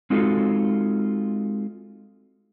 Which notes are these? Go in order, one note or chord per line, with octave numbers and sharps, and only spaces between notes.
G#3 C4 D#4 F4 F#4 A4